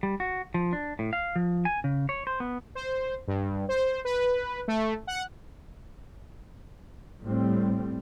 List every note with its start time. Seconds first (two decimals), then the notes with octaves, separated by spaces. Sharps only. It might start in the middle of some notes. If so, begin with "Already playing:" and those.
0.03 G3
0.20 F#4
0.54 F3
0.73 D4
0.99 A2
1.13 F5
1.36 F3
1.65 G#5
1.84 C#3
2.09 C#5
2.27 C5
2.40 B3
2.75 C5
3.28 G2
3.69 C5
4.05 B4
4.68 A3
5.07 F#5
7.23 A2 G3 C4